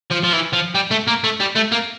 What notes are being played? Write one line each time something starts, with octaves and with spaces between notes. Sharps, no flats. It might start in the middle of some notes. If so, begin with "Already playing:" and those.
F3
F3
E3
F3
G3
A3
A#3
A3
G3
A3
A#3